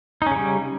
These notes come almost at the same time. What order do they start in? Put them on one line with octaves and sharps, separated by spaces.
D#4 C#4 C#3 G3